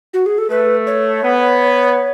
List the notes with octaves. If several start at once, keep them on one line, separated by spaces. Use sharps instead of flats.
F#4
G#4
A4
A3 B4
C#5
B3